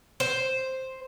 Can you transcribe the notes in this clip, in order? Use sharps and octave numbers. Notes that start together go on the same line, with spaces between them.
C5